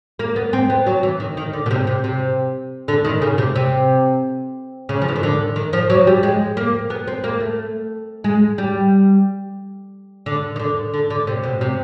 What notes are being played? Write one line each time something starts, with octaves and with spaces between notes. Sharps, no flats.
A#3
B3
C4
B3
F#3
E3
D#3
D#3
D3
B2
C3
C3
C3
D3
D#3
C#3
C3
C3
C#3
F3
E3
D#3
D3
D#3
F3
F#3
G3
G#3
A#3
B3
C4
A#3
A3
G#3
G3
D3
D#3
D3
D3
D3
C3
B2
C3